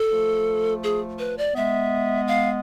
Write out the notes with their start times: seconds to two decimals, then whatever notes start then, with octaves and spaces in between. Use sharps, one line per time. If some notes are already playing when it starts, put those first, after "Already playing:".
Already playing: A4
0.11 F3 A3
0.84 G#4
1.19 B4
1.38 D5
1.55 G#3 B3 E5
2.28 F5